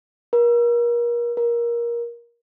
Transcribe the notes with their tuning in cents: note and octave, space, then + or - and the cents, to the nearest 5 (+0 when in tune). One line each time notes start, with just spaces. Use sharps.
A#4 +35
A#4 +20